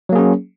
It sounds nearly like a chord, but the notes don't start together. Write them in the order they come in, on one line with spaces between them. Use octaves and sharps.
F#3 A#3 G#4 C#4